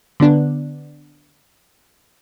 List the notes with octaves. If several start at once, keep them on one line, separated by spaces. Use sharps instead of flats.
D3 B3 D4